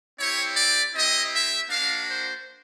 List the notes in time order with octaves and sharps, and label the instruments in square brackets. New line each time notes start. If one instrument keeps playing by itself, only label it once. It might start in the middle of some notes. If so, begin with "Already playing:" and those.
[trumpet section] C4 E4 G4 C#5
D5
C4 E4 G4 D#5
E5
A#3 D4 F#4 F5
C5